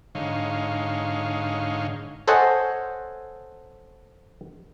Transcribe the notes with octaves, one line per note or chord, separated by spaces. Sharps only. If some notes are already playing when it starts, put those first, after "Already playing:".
G#2 D3 D#4 C#5 F5
A4 C5 C#5 D#5 F#5 G#5